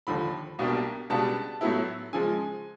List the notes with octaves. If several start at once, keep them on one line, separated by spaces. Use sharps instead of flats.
D#2 D3 F3 B5
C2 B2 G3 A#3 D4
C#2 B2 G3 B3 D4 A5
A2 F#3 B3 E4
C#3 F3 G#3 G#5